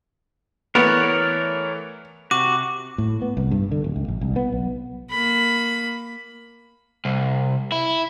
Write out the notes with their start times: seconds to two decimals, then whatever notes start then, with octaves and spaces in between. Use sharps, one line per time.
0.75 E3 A3 B3 A#4 C#5 D5
2.31 C3 F#4 D6
2.98 A2
3.22 B3
3.37 C2
3.51 G2
3.71 D3
3.84 D1
3.96 C#2
4.08 A#1
4.21 C2
4.36 B3
4.52 B1
5.10 A#3 B5
7.05 C2
7.72 E4